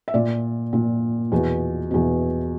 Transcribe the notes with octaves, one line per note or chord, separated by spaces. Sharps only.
E5
A#2 D5
A#2
E2 B2
E2 B2